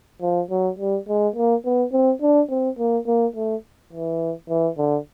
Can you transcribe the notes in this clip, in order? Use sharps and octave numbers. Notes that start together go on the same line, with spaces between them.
F3
F#3
G3
G#3
A#3
B3
C4
D4
C4
A#3
A#3
A3
E3
E3
D3